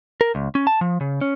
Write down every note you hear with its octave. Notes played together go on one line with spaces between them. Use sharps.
A#4
C#2
C#4
A5
F3
C#3
C#4